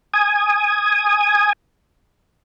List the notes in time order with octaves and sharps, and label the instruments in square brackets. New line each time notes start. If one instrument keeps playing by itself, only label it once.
[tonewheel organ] G#5 D#6